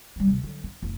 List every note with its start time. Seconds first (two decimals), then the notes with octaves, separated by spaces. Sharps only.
0.16 F#3 G3
0.28 D1 C3
0.44 D3 F#3
0.64 D4
0.82 F1 D#3